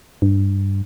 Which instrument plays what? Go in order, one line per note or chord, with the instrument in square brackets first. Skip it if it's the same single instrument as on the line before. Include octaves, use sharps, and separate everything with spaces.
[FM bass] G2